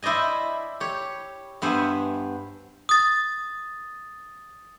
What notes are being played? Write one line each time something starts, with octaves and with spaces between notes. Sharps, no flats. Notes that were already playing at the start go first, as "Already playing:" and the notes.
E4 C5 D5 D#5 G#5
G4 C#5
G2 B3 C5 E5 G#5
D#6 A6